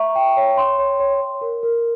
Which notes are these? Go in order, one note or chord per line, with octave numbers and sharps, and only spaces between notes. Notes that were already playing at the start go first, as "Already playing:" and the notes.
Already playing: E5 A#5 C#6
G5
C#5
C6
C#5
C#5
C#5
A#4
A#4